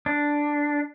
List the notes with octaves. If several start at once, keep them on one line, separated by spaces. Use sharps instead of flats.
D4